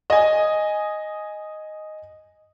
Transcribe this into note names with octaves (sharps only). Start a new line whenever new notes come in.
D#5 G#5